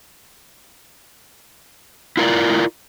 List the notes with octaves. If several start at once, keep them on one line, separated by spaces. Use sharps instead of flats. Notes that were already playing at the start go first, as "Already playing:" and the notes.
E4 F4 A#4 C5 D5